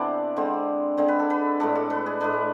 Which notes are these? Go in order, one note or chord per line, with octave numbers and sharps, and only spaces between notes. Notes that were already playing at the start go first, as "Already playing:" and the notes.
Already playing: C3 E3 B3 D4 A4 C5 D5 E5
D3 G#3 C4 C5
D3 G#3 C4 C5
B4
A4
B4
A2 G#3 D4 A4
A4
B4
G#4
A2 G#3 D4 B4